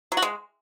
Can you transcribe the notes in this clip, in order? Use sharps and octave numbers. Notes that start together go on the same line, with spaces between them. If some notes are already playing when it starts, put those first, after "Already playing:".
F#3
F#4
G#3